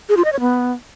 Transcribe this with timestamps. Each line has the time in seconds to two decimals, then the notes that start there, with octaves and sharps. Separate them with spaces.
0.09 G#4
0.17 F4
0.25 D#5
0.33 C#5
0.40 B3